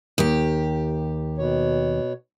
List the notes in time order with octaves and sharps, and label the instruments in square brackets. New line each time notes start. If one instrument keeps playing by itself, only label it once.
[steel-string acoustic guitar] D#2 G4
[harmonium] B2 C#5